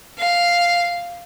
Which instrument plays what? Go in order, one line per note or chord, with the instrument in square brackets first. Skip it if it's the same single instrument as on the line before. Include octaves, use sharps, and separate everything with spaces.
[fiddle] F5